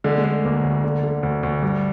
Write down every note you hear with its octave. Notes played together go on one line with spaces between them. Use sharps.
D3 G#3
G#3
D3
A3
D2 A#3
D2
D3
D3
D2
D2
G2